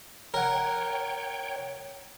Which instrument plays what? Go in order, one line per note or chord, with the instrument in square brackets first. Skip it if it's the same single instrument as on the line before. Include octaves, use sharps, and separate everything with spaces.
[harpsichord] A#4 F#5 [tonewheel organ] C#5 G5